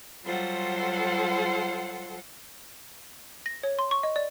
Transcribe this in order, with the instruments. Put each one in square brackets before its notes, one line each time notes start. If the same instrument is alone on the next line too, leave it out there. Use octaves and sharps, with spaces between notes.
[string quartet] F#3 G3 F4 A4 C5 F#5
[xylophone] A#6
C#5
C6
C#6
D#5
D5